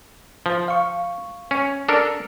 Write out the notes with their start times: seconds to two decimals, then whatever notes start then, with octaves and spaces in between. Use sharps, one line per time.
0.46 F3
0.68 F5 C#6
1.51 C#4
1.89 D4 A4 A#4